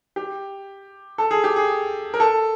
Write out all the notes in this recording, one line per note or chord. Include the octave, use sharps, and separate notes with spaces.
G4
A4
G#4
G4
G#4
A#4
A4